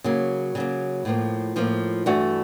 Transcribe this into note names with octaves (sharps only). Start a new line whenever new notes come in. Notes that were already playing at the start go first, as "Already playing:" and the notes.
C#3 F#3 A#3
C#3 F#3 A#3
A2 F3 A#3
A2 F3 A#3
G2 E3 A3 D4 F#4